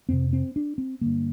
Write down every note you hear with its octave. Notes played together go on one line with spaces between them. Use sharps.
F2 C3 C4
C4
D4
C4
G2 D3 A#3